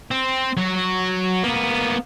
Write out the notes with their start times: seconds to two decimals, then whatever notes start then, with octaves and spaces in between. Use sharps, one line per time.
0.11 C4
0.57 F#3 F#4
1.43 A#3 B3